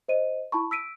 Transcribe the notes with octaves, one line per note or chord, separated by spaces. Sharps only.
C5 D#5 D#7
E4 A5 B5 C#6
E6 B6 D7 D#7